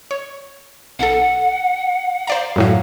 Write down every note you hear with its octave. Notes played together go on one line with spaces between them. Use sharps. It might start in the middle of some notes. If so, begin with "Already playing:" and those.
C#5
B1 A4 F#5
C5 D5 F5 A#5
F#2 A2 F#3